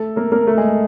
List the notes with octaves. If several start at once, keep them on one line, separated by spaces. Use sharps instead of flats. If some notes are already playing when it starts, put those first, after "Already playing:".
Already playing: A3 A4
A#3 A#4
A#3 A#4
A3 A4
G#3 G#4